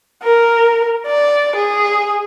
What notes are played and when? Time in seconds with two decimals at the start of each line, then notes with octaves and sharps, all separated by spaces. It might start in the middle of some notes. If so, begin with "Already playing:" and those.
0.23 A#4
1.06 D5
1.56 G#4